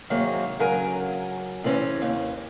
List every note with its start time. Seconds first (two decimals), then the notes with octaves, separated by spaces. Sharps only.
0.10 C3 D#3 F#3 G#3 A#3
0.60 C#3 F#3 A#4 G#5
1.64 C3 E3 C4 C#4
2.02 D#2